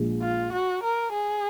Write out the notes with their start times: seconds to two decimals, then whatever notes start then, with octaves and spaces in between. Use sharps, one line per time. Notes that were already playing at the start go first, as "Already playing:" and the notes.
Already playing: A#1 A#2 G#3
0.22 F4
0.52 F#4
0.83 A#4
1.13 G#4